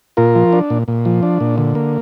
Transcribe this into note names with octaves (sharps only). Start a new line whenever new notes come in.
A#2 F4 A#4
F3
D4
A#2
A#2
F3
D4
A#2
D3
A#3